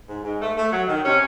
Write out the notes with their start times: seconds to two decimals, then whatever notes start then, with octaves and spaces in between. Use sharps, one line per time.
0.09 G#2
0.24 G#2
0.41 A3
0.57 A3
0.73 F#3
0.88 D#3
1.04 C3 C#4